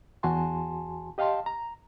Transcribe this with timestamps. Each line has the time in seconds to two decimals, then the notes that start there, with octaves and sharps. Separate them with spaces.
0.23 E2 F#4 G#5 A5 C6
1.18 G4 D#5 F5 G5 A5 C6
1.46 A#5